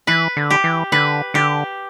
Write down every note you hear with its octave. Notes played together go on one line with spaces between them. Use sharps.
E3 B4
D3
G4
E3
D3 B4
D3 G4